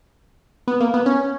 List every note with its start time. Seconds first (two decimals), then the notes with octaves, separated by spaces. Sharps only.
0.68 B3
0.80 A#3
0.94 B3
1.06 C#4